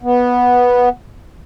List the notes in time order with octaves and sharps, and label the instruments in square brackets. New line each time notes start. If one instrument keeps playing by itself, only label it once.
[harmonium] B3